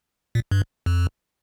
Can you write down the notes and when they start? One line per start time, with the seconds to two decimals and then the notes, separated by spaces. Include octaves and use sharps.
0.35 A#2
0.51 G2
0.86 F2